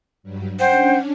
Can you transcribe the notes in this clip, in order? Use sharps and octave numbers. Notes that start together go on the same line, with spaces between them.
G2 F#3 G3
C#4 D4 C5 F#5 G5